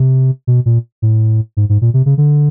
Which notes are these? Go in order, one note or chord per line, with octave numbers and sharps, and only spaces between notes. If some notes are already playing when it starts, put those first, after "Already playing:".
Already playing: C3
B2
A#2
A2
G#2
G#2
A#2
C3
C#3
D3